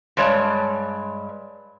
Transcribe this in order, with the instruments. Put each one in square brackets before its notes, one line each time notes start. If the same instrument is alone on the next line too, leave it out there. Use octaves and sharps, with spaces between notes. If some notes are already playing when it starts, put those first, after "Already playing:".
[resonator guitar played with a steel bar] G2 G#3 C#5 D5 A5